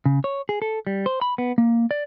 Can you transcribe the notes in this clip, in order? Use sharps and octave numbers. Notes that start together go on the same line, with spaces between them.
C#3
C#5
G#4
A4
G3
C5
B5
B3
A#3
D5